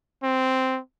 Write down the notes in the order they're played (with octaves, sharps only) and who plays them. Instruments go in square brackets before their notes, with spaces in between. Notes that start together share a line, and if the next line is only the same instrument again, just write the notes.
[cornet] C4